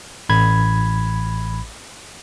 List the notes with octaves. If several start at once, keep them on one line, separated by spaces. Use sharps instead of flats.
A1 B5 G#6